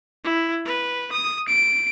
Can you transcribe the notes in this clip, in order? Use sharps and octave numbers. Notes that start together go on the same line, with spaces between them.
E4
B4
D#6
D7